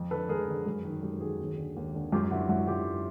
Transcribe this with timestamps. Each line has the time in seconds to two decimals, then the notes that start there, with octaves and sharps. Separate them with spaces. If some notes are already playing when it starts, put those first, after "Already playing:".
Already playing: F2
0.11 D3 A4 B4
0.29 F2 G#4 A#4
0.48 D3
0.66 F#2
0.85 D#3
1.02 F#2 G4 A4
1.21 D#3 F#4 G#4
1.40 D#2
1.58 D3
1.76 D#2
1.94 D3
2.12 F#2 F4 G4
2.31 D3 E4 F#4
2.49 F#2 E4 F#4
2.67 D3 F4 G4